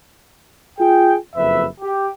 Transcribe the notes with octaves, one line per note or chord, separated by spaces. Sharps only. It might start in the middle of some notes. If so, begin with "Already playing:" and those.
F4 G#4 G5
F#1 F2 B4 E5
G4